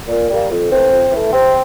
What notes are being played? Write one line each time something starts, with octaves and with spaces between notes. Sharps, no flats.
A#2
G3 A#3
F2
E3 A3 C4
F2
E3 A3
C3 C4